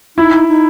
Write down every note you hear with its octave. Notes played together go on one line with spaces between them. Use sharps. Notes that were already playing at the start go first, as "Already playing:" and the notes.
D#4 E4
D#4